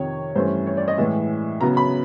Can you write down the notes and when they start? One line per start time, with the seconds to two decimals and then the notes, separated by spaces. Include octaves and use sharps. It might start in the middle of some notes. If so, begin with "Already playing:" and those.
Already playing: F2 C3 D#3 C#5
0.35 G2 E3 A3 C#4 C5
0.67 C#5
0.77 D5
0.88 D#5
0.98 A2 E3 G#3 E5
1.61 C#3 F#3 B3 A#5
1.77 B5